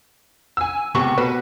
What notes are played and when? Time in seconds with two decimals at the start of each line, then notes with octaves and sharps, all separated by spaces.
0.57 G#5 E6
0.95 C#2 C3 B3 C#6
1.18 B2 B4